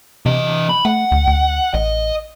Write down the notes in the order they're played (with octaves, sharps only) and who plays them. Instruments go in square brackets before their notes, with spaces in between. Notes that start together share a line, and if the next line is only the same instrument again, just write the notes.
[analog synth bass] C3 [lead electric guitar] E3 D#5
[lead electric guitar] B5
[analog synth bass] A3 [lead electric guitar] F#5
[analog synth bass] D2
D2
[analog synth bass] A1 [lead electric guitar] D#5